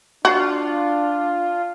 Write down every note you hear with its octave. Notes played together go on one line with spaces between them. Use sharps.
D4 F4 F#4